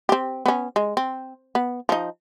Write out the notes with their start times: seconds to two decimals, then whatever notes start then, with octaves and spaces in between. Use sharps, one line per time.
0.09 C4 G4
0.46 B3 C#4
0.76 G#3
0.97 C4
1.55 B3
1.89 F3 D#4